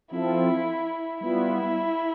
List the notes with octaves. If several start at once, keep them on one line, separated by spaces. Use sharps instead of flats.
F3 C4 E4 F4 A4
G3 B3 E4 F4